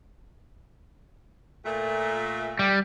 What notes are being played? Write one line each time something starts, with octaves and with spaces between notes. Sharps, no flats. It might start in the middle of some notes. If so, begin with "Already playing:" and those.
A#2 A3
G3